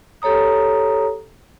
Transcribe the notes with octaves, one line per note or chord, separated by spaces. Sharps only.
G4 A4 C#5 A#5 D#6